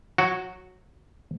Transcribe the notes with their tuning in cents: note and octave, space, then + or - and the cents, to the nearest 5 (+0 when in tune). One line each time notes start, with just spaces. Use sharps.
F#3 -15 F#4 +0